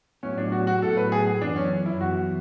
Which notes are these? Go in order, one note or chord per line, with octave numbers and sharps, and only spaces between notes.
A2 F#3 B3 C#4 E4
D4
F#4
F#4
A2 F#3 B3 E4 A4
B4
G#4
G#4
F#2 E3 B3 D4
C#4
E4
F#2 E3 B3 F#4